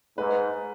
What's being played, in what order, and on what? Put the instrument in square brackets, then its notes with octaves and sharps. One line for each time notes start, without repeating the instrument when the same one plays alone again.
[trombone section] G#2 [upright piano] B4